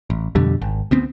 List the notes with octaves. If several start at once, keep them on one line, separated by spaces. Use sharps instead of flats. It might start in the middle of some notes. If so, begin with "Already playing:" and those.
A1
F2 B2 D3 G3
G#1
D2 B3 C4